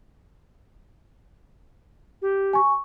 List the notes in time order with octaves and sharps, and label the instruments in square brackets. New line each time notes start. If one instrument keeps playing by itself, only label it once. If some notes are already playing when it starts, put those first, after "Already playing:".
[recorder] G4
[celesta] G#5 C#6